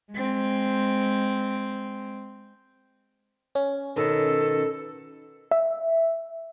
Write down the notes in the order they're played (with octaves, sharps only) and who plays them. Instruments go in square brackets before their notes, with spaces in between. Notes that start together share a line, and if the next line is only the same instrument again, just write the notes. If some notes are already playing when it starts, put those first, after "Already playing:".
[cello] G#3 C4
[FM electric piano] C#4
[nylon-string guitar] B2 D#3 [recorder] A4
[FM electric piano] E5